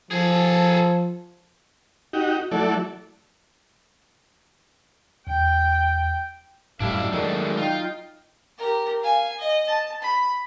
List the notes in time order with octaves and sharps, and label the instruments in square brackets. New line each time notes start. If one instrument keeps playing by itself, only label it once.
[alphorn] F3 [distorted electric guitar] G#4 A4
[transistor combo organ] D#4 F#4 G4
F#3 A3 E4 A4 D5
[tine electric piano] E2 [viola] G5
[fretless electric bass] F#2 A2 [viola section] G3 F5 [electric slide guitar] D4 E4
[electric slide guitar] D#3 G#3 A3 [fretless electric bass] F#3 [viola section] F#4 D5
[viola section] D#4 G5 [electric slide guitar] F4
[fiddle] G4 A#4
F5 G#5
D#5
A5
B5